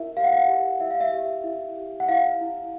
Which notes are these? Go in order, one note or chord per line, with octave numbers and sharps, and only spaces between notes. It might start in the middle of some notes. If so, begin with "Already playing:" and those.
Already playing: E4 A#4 E5
G4 F5
F#5
F5
G4
E4 E5
F5
E5
G4
E4
G4
F#5
E4 F5
E4